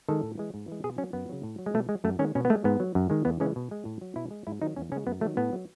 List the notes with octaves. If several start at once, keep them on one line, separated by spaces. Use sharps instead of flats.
D#3 G#3 A4
A2
E3 G#3
G#2
E3 G#3
B2 G#4
F#3 C#4
F#2 B3
C#3 F#3
A2
F#3
G#3
B2 A3
G#3
F#2 A3
D#3 G#3 C#4
B2 C#4
B3
G#3 A3
G#2 B3
F#3
F#2
D#3 G#3
E2 B3
C#3 E3 G#3 C#4
B2
G#3
A2
F#3
B2 E4
G#3
G#2 E4
D#3 F#3 D#4
E2 C#4
C#3 G#3 C#4
F#2 B3
D#3 F#3 A3
A2 B3
F#3